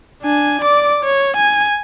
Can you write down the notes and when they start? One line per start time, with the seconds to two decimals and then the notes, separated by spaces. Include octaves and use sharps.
0.23 D4 G#5
0.61 D5 D6
1.04 C#5
1.37 G#5